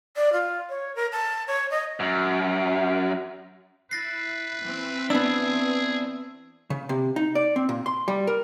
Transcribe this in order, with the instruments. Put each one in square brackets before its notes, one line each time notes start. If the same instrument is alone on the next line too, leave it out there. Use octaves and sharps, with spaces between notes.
[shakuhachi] D5
F4
C#5
A#4
A5
C#5
D#5
[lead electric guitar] F#2
[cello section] E4 [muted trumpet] B4 [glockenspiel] A6 A#6 C7
[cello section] E3 C4
[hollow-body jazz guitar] B3 D4 [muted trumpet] G#4 [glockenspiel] E6
[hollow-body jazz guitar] C#3
C3
D#4
D5
C4
A#2
C6
G3
A#4